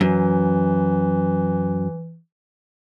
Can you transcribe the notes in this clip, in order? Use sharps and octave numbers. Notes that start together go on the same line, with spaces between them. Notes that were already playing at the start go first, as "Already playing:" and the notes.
F#2 E3